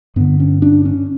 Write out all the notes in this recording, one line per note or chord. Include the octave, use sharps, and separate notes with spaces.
G2 D3 B3
C#4
D4
C#4